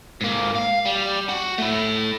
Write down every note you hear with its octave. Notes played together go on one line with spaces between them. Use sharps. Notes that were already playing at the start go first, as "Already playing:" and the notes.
G#2 A#3
F5
G3
F#4
A3 E4